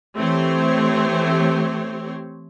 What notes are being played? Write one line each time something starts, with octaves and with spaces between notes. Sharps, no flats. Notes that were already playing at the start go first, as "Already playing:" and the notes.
E3 A3 C4 G4 C5 C#5